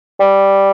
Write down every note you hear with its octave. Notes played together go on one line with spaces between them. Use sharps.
G3